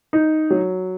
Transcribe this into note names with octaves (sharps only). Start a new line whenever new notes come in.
D#4
F#3